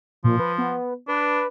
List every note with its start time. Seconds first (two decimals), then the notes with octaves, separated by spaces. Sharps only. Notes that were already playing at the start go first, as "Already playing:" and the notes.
0.24 A#2 F3
0.39 B4
0.58 B3
1.08 D4 B4